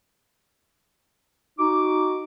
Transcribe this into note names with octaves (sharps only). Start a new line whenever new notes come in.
D#4 F#4 D6